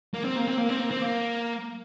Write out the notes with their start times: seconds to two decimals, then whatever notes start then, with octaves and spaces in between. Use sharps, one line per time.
0.14 A#3
0.25 C4
0.36 A#3
0.47 C4
0.58 A#3
0.69 C4
0.79 A#3
0.91 C4
1.01 A#3